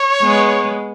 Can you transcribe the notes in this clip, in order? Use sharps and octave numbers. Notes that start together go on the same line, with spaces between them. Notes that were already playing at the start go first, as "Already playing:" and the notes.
Already playing: C#5
G#3 B3